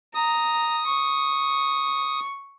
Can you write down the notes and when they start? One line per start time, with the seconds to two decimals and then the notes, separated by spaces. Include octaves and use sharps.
0.15 A#5 D#6
0.87 C#6